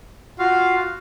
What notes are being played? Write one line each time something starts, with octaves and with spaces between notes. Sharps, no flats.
F4 F#4 F5